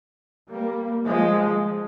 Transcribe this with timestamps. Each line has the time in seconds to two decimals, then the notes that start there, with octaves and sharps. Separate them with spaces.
0.49 G3 A#3
1.06 F3 G#3